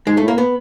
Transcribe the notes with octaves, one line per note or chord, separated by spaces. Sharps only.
G#2 G#3
A2 A3
A#3
B3